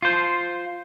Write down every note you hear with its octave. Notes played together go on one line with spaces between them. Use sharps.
F4 C5